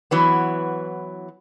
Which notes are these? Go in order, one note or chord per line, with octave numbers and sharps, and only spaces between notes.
E3 F#3 B3